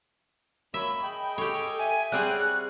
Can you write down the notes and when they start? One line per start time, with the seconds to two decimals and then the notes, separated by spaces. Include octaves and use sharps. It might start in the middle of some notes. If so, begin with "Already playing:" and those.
0.74 F#2 A#3 C#5 E5 B5
1.03 G#4 D#5 G5
1.38 G4 A4 C#5
1.79 E5 G#5
2.12 G3 C4 G#4 C#5 F#5 F#6